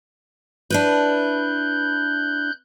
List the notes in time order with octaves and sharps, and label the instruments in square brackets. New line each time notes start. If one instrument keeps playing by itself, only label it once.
[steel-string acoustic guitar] D4 E4 B4 [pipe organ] F#6 G6